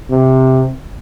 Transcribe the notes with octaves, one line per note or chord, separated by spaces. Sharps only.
C3